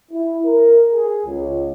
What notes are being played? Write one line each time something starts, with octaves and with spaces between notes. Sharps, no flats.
E4
A#4
G#4
C#2